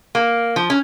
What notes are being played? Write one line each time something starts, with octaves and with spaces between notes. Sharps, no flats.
A#3
F3
C#4